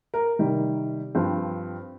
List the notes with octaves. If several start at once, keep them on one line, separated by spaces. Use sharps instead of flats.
A#4
C3 D#3 G3
G2 F3 C4